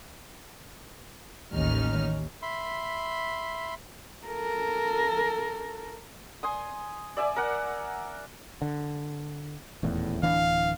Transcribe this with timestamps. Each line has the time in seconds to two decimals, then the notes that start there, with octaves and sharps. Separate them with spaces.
1.53 A1 D#2 A2 C#4 D#4 F6
2.42 E5 B5 C6
4.26 A4 A#4
6.43 G#5 C6 D#6
7.17 D5 E5 G#5 D6
7.36 A#4 D5 F#5
8.62 D3
9.83 D#1 E2 A2
10.23 D1 E3 D4 F5